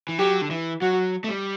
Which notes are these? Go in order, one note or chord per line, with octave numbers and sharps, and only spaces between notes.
E3
F#3 G4
D3
E3
F#3 F#4
A3
G3